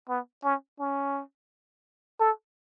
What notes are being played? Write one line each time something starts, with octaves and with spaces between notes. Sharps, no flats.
B3
C#4
C#4
A4